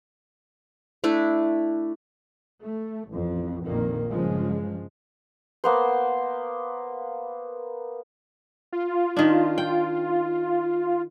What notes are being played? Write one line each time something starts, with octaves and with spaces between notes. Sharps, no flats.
A3 D4 E4
A3
A1 F2
A#1 F2 A#2 D#3 A#3
G2 C#3 F3 G#3
A#3 B3 C5
F4
D#3 D4
G5